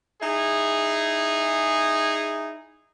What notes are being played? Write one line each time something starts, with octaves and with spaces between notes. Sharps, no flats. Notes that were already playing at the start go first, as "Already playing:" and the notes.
D#4 E4 G#4